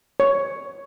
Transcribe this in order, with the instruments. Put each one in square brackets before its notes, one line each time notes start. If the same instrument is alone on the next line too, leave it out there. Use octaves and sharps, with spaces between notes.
[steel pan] C#5